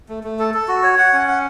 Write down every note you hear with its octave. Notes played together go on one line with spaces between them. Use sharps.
A3
A3
A4
A4
F#4
C#5
F#5
C#4
F#5